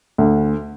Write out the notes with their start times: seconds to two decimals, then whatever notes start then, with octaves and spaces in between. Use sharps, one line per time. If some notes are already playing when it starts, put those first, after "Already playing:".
0.18 D2